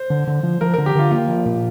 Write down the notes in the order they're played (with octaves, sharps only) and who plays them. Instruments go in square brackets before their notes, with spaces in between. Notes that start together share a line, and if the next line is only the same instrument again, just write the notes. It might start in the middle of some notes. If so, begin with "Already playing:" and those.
Already playing: [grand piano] C5
[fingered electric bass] D3
D3
F3
[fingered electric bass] F3 [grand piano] A#4
[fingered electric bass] D3 [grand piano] A#4
[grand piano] G4
[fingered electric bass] D3 [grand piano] F4
[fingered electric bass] A#3 [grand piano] F4
[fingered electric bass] F3
A#2